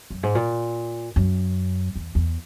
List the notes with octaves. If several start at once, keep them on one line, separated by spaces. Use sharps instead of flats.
F#2
G#2
A#2
F#2
E2
E2